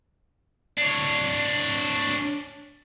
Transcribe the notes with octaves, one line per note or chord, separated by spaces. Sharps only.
D4 C#5